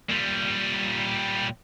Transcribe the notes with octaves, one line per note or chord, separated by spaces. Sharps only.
A#2 G3